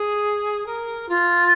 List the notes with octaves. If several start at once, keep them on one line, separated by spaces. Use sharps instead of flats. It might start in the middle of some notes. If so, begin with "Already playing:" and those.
Already playing: G#4
A#4
F4